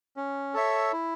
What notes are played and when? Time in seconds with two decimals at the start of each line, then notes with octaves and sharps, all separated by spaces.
0.17 C#4
0.54 A4 C#5 E5
0.93 E4